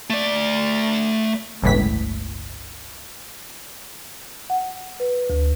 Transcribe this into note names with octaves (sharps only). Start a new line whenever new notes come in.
A3 D5
G1 C#2 A2 E3 B6
F#5
B4
D2